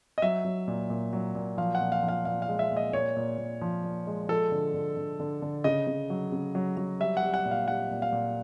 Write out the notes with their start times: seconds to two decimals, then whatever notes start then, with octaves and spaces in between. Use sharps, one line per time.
0.18 D#5
0.22 F#3 E5
0.45 F#3
0.68 A#2
0.90 A#2
1.13 F#3
1.35 A#2
1.57 F3 F5
1.75 F#5
1.81 A#2
1.92 F5
2.03 F3
2.08 F5
2.25 A#2 F5
2.42 F5
2.48 G#3
2.59 E5
2.71 A#2
2.77 D#5
2.93 A#2 C#5
3.16 A#2
3.38 A#2
3.61 F3
3.84 A#2
4.07 G#3
4.29 F3 A4
4.52 D3
4.74 D3
4.97 D3
5.20 D3
5.42 D3
5.64 C#3 D#5
5.87 C#3
6.10 F#3
6.32 C#3
6.55 F#3
6.77 F#3
7.00 G3 E5
7.17 F#5
7.23 G3
7.34 F#5
7.46 A#2
7.51 F5
7.68 G3 F#5
7.91 A#2
8.02 F5
8.12 A#2